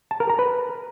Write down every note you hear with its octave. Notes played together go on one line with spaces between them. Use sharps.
A5
A#4
A#5
B4